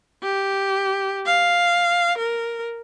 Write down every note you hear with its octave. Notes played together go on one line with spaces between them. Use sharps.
G4
F5
A#4